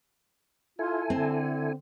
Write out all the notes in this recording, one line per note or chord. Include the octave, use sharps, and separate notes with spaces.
E4 F4 A4 G#5
D3 C4